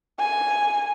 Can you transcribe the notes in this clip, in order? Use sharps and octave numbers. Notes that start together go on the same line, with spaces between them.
G#5